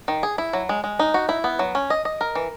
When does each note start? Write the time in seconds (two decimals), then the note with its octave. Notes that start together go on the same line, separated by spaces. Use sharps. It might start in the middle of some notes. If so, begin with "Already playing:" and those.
0.08 D#3
0.23 G#4
0.38 E4
0.53 F#3
0.69 G#3
0.84 G#3
0.99 D#4
1.14 F#4
1.29 E4
1.44 B3
1.59 F#3
1.75 C#4
1.90 D#5
2.05 D#5
2.21 A#4
2.35 E3